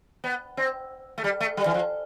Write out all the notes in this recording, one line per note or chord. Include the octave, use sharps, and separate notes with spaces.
B3
C4
A3
G3
A3
G3
E3
F3